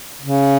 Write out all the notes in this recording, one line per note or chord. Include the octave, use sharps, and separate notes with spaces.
C#3